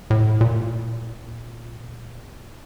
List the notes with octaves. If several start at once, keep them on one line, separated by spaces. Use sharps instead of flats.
A2
A#2